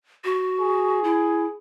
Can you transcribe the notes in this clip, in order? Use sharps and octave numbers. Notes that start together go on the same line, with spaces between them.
F#4
G#4
E4